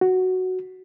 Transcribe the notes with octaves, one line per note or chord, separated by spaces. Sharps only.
F#4